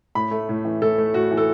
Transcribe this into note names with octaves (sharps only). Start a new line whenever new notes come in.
A2 B5
A3
A2
E3
A2 A4
A3
A2 F#4
E3
A4